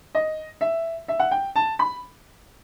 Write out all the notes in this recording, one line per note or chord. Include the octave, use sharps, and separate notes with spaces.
D#5
E5
E5
F#5
G5
A5
B5